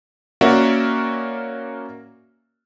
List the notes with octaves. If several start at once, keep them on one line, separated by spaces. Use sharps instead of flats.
A#3 C#4 F#4 A#4 D5 E5